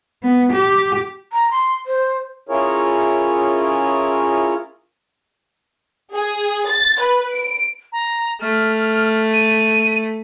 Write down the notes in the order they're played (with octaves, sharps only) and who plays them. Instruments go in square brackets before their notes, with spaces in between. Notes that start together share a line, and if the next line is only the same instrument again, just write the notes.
[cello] B3
G4
[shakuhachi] A#5
C6
C5
[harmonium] C#4 E4 F4 G#4 A#4 C#5
[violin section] G#4
A6
B4
D7
[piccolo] A#5
[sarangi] A3 [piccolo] F6
[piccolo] D#7